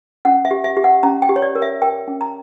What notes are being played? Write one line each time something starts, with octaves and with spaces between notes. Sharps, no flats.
C#4 F#5
E5
G4
E5
G4
F#5
C#4 A#5
G5
G4
C#5
D5
A#4
E5
A#4 G5
C#4
A#5